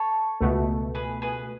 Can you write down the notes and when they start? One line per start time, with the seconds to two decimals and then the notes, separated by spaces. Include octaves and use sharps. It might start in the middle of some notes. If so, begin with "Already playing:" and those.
Already playing: A4 C#5
0.41 C#2 B2 A3
0.95 G#4 B4
1.22 G#4 B4